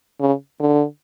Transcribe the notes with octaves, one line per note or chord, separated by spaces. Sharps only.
C#3
D3